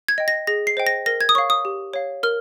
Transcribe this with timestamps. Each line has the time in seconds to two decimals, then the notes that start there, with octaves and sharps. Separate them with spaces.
0.08 G#6
0.18 D#5 G5
0.28 A#6
0.47 G#4 A#6
0.67 C7
0.77 C5 D#5 G5
0.87 A#6
1.06 A#4 A#6
1.21 G#6
1.29 D#6
1.35 C#5 F5 C#6
1.50 D#6
1.65 G4
1.94 C#5 F5
2.23 A#4 F6